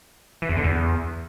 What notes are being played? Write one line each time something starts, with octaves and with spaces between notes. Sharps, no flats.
E3
E2
D3
E2